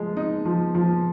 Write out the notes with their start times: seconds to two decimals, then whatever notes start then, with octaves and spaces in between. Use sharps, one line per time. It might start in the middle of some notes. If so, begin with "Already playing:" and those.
Already playing: F3 G#3
0.17 D#4
0.45 F3
0.75 F3